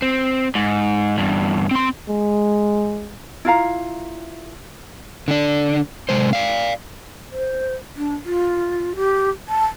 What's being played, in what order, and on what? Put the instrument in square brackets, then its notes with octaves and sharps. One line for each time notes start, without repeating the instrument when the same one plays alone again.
[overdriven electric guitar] C4
G#2
E2 G2
C4 C6
[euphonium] G#3
[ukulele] E4 F4 F5 A#5
[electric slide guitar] D3 D4
C3 G#3 C5
D5 F5
[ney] C5
D4
F4
G4
A5